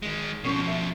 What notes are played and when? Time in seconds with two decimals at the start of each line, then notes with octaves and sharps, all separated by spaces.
0.03 D#3 G#3
0.44 B2 F3 C#4 C#5
0.67 E5